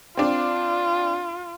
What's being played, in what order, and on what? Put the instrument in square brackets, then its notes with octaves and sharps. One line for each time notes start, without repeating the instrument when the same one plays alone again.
[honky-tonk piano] C4 D4 [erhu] F4